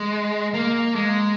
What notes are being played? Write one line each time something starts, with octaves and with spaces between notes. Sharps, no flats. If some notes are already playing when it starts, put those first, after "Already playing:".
Already playing: G#3
A#3
G#3